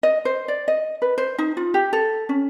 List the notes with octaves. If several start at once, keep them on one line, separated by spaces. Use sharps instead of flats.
D#5
C5
D5
D#5
B4
C5
D#4
F4
G4
A4
C#4